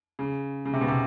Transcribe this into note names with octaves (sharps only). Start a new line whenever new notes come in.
C#3
C#3
C3
B2
C3